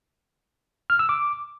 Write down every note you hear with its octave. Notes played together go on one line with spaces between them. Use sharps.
F6
E6
D6